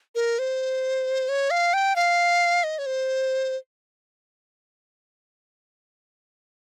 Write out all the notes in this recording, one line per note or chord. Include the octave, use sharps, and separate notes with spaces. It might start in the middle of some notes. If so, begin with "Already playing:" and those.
A#4
C5
C#5
F5
G5
F5
D#5
C#5
C5